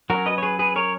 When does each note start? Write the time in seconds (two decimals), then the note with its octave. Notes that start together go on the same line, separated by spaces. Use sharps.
0.10 F#3 C#4 F#4 A#4
0.26 B4 D#5
0.38 C#5
0.43 G#4 B4
0.59 G#4 B4
0.76 A#4 C#5